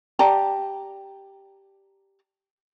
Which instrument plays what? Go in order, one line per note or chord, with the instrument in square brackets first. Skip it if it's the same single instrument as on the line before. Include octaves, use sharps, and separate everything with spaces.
[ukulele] G4 D5 A5 A#5